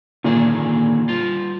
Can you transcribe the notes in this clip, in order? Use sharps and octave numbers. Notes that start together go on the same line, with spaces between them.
A#2 D3 D#3 G#4
G3 F4